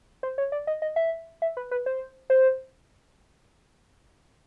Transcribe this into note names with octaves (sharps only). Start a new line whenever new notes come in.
C5
C#5
D5
D#5
D#5
E5
E5
B4
B4
C5
C5